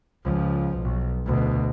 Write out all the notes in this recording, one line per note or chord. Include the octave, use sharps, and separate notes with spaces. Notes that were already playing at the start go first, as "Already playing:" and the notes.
C#2 F3
B1
D2 B2